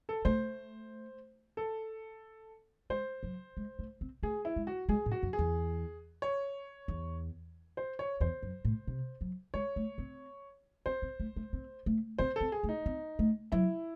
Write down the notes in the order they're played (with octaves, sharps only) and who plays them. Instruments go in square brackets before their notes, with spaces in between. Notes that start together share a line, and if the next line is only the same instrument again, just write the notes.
[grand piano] A4
[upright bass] A3 [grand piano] C5
[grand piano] A4
[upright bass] G#3 [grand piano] C5
[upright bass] F#3
G#3
A3
C4
[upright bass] A3 [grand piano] G#4
[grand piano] E4
[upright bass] G#3
[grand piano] F#4
[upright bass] G#3 [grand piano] G#4
[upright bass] A2
[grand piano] F#4
[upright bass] F#2
[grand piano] G#4
[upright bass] E2
[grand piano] C#5
[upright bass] E2
[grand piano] C5
C#5
[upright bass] E2 [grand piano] C5
[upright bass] F#2
A2
C3
F#3
[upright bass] G#3 [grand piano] C#5
[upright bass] A3
C4
[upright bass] C4 [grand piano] C5
[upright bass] C4
A3
A3
C4
A3
[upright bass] C4 [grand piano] C5
[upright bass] C4 [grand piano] A4
[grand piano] G#4
[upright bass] A3
[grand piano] D#4
[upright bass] C4
A3
[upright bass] F#3 [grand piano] E4